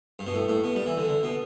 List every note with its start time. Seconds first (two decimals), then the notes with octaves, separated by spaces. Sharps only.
0.19 G2
0.27 B2
0.34 A2
0.49 A2
0.64 B2
0.75 G3
0.86 E3
0.98 D3
1.08 D3
1.23 B2